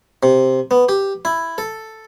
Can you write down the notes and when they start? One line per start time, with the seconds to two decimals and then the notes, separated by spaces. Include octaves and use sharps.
0.23 C3
0.71 B3
0.89 G4
1.25 E4
1.58 A4